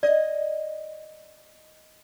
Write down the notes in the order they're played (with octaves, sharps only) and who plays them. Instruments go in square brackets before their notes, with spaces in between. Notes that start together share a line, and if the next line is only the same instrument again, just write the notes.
[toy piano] D5 [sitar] D#5